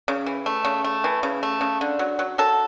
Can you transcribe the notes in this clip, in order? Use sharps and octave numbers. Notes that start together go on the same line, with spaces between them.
C#3
E3
A3
C#3
A3
E3
C#3
A3
C#3
D3
F#3
F#3
F#3 A4